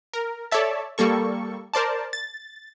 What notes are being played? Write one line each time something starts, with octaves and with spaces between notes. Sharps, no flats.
A#4
A4 C#5 D5 E5 A5
G3 A#3 A4 C#6
A#4 C5 D5 A5
A6